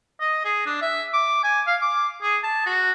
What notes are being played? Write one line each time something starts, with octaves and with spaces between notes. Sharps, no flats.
D#5
G#4
D4
E5
D6
G#5
F5
D6
G#4
A5
F#4